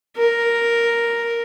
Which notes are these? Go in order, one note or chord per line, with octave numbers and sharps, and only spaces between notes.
A#4